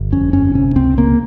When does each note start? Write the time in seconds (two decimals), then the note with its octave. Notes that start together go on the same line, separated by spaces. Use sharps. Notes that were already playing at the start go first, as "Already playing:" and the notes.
Already playing: G1
0.12 F2 C#4
0.33 G1 C#4
0.54 C3 C#4
0.75 C#2 C4
0.98 C#3 A#3